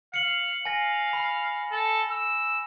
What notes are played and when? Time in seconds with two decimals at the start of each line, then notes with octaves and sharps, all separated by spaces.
0.14 F5 C#7 F#7
0.65 F5 G#5 A#6
1.13 B5
1.72 A4
2.11 E6